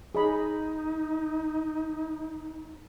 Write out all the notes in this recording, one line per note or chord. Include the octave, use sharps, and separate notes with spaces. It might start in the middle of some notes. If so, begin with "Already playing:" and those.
D#4 G#4 D#5 B5